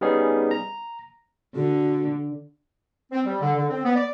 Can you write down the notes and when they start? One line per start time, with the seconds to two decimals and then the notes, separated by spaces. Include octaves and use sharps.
0.01 G3 B3 C#4 D#4 G#4
0.51 A#5
1.55 D3 F#4
3.12 C4
3.25 G3
3.41 D3
3.57 D3
3.70 C4
3.84 B3
3.95 D5